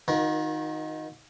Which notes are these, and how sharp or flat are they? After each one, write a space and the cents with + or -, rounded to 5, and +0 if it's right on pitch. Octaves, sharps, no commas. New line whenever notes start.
D#3 +0 F#4 -45 A#4 +30